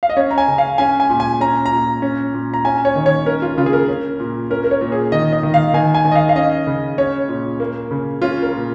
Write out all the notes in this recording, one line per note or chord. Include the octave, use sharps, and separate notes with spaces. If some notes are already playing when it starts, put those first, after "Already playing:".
F5
D#5
C#4 C#5
A#5
G#5
C#3
F5
C#4 G#5
G#5
A#2
G#5
C#4 A#5
A#5
A#2
C#4
A#2
A#5
C#4 G#5
C#5
D#3
C#5
C#4 A#4
F4
C#3 F4
G#4
A#4
C#4
A#2
C#4 A#4
A#4
C#5
A#2
G#4
D#3 D#5
D#5
D#3
F5
D#3 G#5
G#5
D#3
D#5
F5
F5
C#4 D#5
C#3
C#4 C#5
A#2
A#3
C#3
C#4 F4
A#4
A#2